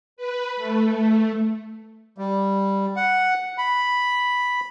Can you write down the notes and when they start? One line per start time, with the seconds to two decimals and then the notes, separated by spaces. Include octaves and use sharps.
0.17 B4
0.57 A3
2.18 G3
2.96 F#5
3.58 B5